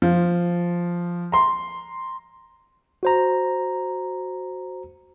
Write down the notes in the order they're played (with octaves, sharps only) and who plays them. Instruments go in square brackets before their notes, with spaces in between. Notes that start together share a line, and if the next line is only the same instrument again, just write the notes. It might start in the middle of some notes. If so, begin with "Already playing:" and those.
[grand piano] F3
A#5 C6
[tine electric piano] F#4 C5 A#5